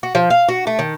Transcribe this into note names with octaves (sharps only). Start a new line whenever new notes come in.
F#4
F3
F5
F#4
A3
D#3